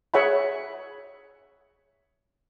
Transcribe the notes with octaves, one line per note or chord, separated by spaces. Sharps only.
G#4 C#5 E5 F#5 G#5 B5